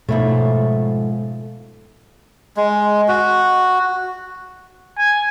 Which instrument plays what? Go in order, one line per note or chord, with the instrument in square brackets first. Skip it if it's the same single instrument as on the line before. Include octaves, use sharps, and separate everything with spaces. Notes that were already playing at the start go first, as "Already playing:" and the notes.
[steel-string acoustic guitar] G#2 F3 A3 [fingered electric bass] B2 [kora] E4 C#5
[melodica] G#3
F#4
[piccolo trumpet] G#5